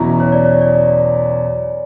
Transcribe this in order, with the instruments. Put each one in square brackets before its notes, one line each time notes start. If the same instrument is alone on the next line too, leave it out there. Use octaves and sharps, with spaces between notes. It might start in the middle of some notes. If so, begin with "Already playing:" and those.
Already playing: [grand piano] E2 B2 F#3 C#4 E4 [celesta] A#5
[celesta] C#5
D5
C#5
D5